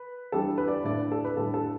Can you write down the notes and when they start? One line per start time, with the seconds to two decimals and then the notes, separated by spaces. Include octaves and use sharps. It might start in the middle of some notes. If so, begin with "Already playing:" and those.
Already playing: B4
0.32 E3 G3 D4 A4
0.58 B4
0.68 D5
0.84 A2 A3 D4 D5
1.12 A4
1.25 B4
1.36 A2 G3 D4 A4
1.54 A4